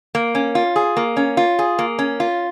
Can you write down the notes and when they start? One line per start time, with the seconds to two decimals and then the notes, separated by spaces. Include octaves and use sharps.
0.15 A#3
0.35 C#4
0.55 F4
0.76 G#4
0.97 A#3
1.17 C#4
1.37 F4
1.59 G#4
1.79 A#3
1.99 C#4
2.20 F4